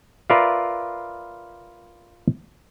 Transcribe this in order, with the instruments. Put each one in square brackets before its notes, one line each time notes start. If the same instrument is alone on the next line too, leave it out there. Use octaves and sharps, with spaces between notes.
[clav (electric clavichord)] F4 A#4 B4 D5 E5 F5